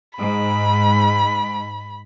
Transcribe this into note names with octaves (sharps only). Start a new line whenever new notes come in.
G#2 B5